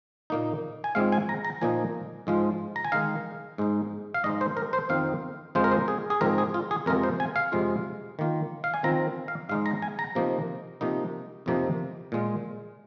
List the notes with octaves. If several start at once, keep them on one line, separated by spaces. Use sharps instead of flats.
A#2 A#3 D#4
G#5
G#2 G#3 C4 F4 F5
G#5
A#5
A#5
A#2 F3 A#3 D#4 G#5
G#2 F3 G#3 F4
A#5
G#5
D#3 G#3 D#4 F5
G#2 G#3 D#4
F5
G#2 G#3 D#4 D#5
C5
A#4
C5
F2 D#3 C4 D#4 F5
F2 F3 G#3 F4 C5
A#4
C5
G#4
G#4
G#2 F3 G#3 C4 F4 A#4
G#4
F4
G#4
F2 C3 G#3 F4 A#4
C5
G#5
F5
F2 C3 G#3 F4
D#3 A#3 F4
F5
G#5
D#3 C4 F4 A#5
F5
G#2 G#3 D#4 F5
A#5
G#5
A#5
C3 F3 A#3 D#4
C3 F3 A#3 D#4
F2 C3 F3 A#3 D#4
A#2 G#3 F4